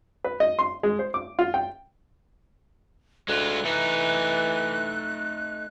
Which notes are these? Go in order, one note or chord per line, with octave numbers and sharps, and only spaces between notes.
B4
D#5
C6
G#3
C5
D6
F4
G5
D2 G#3 F4 F#6
E3 A3 D#4